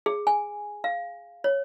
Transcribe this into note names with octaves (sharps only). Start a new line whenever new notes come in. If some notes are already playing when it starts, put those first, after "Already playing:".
G#4
G#5
F5
C#5